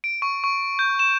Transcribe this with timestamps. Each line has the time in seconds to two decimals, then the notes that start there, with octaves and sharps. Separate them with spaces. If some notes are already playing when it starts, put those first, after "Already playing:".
0.04 D7
0.22 C#6
0.44 C#6
0.79 G6
0.99 E7